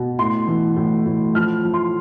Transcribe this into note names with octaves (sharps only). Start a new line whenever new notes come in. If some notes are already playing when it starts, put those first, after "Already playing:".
Already playing: B2
A2 C6
E3
A2
A2
F3 F6
F3
C6